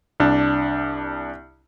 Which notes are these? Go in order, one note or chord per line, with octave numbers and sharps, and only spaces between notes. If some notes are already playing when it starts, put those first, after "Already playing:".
C2 D4